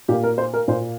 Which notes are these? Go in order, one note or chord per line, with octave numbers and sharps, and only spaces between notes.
A#2 A#3 G4
A#4
C5
A#4
A#2 A#3 C5